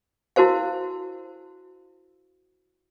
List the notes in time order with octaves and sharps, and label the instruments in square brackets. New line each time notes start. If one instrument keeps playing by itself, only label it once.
[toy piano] E4 F#4 A#4 C5 F5